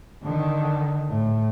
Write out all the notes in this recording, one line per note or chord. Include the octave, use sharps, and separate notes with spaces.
D3 D#3
A2